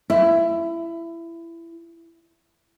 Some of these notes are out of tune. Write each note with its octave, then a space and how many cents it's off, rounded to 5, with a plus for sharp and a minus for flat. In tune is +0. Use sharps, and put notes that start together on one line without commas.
E4 +20